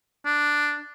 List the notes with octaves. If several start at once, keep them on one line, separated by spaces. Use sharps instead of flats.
D4